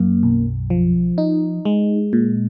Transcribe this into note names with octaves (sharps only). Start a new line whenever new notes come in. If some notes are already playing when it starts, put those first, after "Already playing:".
Already playing: F#2 A#3
B1
F3
D#4
G#3
A#2